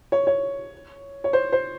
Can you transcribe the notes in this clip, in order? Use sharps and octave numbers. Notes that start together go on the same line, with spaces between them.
C#5
C#5
C#5
C5
C5